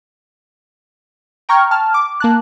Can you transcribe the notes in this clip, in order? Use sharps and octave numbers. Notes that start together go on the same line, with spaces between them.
G5 A#5 C#6 F6 G#6
A5 F6
D6
A#3 A5 F#6